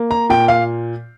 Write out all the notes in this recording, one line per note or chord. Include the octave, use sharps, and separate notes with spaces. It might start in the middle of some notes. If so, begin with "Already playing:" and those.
Already playing: A#3
A#5
A#2 G5
F5